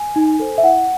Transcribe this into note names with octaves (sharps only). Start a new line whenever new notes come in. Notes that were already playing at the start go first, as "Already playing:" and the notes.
Already playing: G#5
D#4
A4 C5
E5
E4 F#5